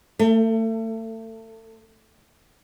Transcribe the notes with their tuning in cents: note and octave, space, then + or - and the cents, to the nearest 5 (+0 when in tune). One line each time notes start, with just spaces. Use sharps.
A3 +30